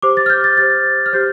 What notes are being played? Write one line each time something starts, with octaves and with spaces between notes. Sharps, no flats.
G4 C5 D6
A6
F6
G6
A6
G4 C5 A6
F6
G4 C5 G6